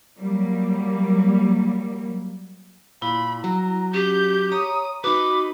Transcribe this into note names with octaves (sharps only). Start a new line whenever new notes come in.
F#3 G3 A#3
A#2 E4 B5
F#3 A#5
C#4 G4 G6
C#5 A#5 D#6
D#4 F#4 B4 B5 D6